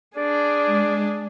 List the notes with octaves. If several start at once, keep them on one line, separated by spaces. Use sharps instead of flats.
D4 G#4 D5
G#3